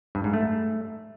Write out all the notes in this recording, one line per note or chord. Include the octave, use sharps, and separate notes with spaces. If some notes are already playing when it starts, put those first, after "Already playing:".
G2
G#2
A3